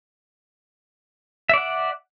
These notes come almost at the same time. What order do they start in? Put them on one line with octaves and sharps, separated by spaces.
E5 D5 F#5